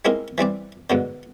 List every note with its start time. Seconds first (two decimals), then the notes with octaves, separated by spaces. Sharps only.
0.05 G#3 A#3 C4 D#4 E4 A#4
0.38 E3 G3 C4 D5
0.90 G#2 B2 D3